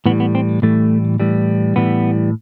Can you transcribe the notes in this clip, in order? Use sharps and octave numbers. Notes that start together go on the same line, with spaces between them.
A2 E3 G3 B3
B3
C4
A2 E3 G3 A3
A2 E3 G3
A2 E3 G3 B3